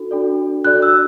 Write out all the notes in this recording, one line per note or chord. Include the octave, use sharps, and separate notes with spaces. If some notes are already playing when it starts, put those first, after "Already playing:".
Already playing: D4 F#4 A4
D4 F#4 A4 D5
D4 F#4 A4 D5 F#6
E6